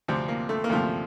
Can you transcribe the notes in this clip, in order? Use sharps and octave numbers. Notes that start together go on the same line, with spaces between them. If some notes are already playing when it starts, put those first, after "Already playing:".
D2 C3 F3 C4
A#3
A3
A#3
D2 C3 F3 A3